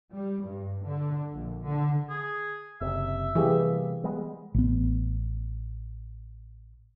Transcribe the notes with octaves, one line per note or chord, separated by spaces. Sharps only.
G3
G2
D3
A#1
D3
G#4
F#1 C3 E5
C3 E3 G3 A#3 G4 G#4
G3 G#3 B3
A1 B3